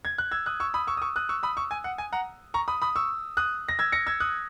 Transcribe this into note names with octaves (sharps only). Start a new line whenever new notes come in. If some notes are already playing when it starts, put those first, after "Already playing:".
G#6
F#6
E6 G#6
D#6 F#6
C#6 E6
B5 D#6
C#6 E6
D#6
C#6 E6
D#6 F#6
C#6 E6
B5 D#6
C#6 E6
G#5
F#5
G#5
F#5 A#5
A#5 C#6
B5 D#6
B5 D#6
C#6 E6
D#6 F#6
A#6
E6 G#6
A#6 C#7
E6 G#6
D#6 F#6